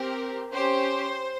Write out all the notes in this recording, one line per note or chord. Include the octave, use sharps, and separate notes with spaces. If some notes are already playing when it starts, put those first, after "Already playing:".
Already playing: C4 G4 A#4
C#4 G4 C5